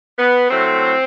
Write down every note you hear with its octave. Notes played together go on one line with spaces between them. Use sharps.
B3
A2 F#3 A3 C4